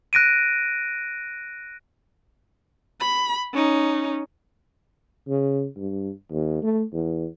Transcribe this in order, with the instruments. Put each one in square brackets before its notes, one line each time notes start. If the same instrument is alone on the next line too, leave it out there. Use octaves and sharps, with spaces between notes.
[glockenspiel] F#6 A#6 D7 D#7
[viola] B5
C#4 D#4
[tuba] C#3
G2
D#2
A3
E2